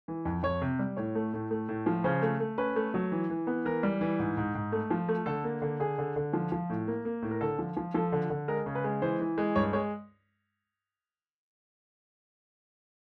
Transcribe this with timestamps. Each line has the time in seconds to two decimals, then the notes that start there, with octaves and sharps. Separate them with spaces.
0.08 E3
0.25 F2
0.43 F2 C#5
0.61 C3
0.79 G3
0.97 A2 C#5
1.15 A3
1.33 A2
1.51 A3
1.68 A2
1.86 F3
2.04 C#3 C5
2.22 A3
2.40 A3
2.58 C#4 B4
2.76 A3
2.94 F#3
3.12 E3
3.30 E3
3.47 B3
3.65 E3 A#4
3.83 G3
4.01 E3
4.19 G#2
4.37 G#2
4.55 G#2
4.72 A3
4.90 F3
5.08 A3
5.26 D3 A4
5.44 A#3
5.62 D3
5.80 D3 G#4
5.98 D3
6.16 D3
6.33 F3
6.52 F3
6.70 A2
6.87 A#3
7.05 A#3
7.22 A2
7.31 A#4
7.41 D3 A4
7.59 F3
7.77 F3
7.94 F3 A4
8.12 D3
8.30 D3
8.48 G#3 A#4
8.66 C#3
8.75 B4
8.84 G#3
9.02 E3 C5
9.20 E3
9.38 G#3
9.55 G2 C#5
9.73 G#3 C#5